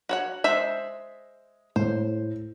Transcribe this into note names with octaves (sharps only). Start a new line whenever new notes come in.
F#4 C#5 F#5
G#3 C5 E5
A2 C5